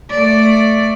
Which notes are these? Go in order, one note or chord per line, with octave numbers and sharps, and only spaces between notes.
A3 D5